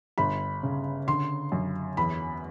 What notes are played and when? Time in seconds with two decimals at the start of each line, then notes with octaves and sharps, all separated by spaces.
0.18 G1 B5
0.63 C#3
1.07 D3 C6
1.52 F#2
1.97 E2 B5